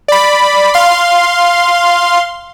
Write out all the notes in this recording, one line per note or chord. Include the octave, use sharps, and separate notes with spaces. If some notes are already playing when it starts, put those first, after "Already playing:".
D5 B5
F5 C6